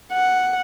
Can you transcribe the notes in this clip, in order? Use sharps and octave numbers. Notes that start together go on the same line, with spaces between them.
F#5